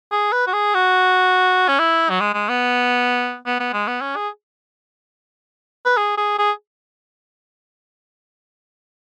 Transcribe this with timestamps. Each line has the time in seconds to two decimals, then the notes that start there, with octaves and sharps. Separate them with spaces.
0.12 G#4
0.33 B4
0.47 F#4
0.53 G#4
0.74 F#4
1.68 C#4
1.79 E4
2.10 F#3
2.20 G#3
2.34 G#3
2.49 B3
3.46 B3
3.60 B3
3.73 G#3
3.88 B3
4.01 C#4
4.16 G#4
5.85 B4
5.97 G#4
6.17 G#4
6.39 G#4